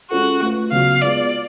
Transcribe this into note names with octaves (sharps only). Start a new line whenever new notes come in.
G#3 C#4 F4 F#4 A4
A3 F4 B4
C#3 F#3 B3 F#4 F5
G#3 B3 F4 D5